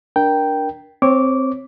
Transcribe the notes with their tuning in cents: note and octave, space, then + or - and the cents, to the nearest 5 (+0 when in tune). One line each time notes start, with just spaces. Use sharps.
D4 +0 A#4 +15 G5 -5
C4 +0 C#5 -20 D6 -15